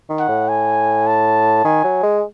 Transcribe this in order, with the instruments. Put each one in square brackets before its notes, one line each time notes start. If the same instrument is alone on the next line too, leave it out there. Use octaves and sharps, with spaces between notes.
[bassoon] D#3
[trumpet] F#5
[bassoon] A2
[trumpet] G#5
A5
[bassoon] D#3 [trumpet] G#5
[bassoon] F#3
G#3